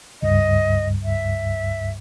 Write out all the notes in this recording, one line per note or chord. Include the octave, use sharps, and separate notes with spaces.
C#2 G2 D#5
E5